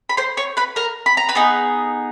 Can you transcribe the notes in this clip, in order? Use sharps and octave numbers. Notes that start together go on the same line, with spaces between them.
B5
C5 C6
C#5 C#6
B4 B5
A#4 A#5
B5
A#5
B4 B5
B3 D#4 G#4